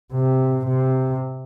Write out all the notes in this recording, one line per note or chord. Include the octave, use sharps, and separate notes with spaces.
C3
C3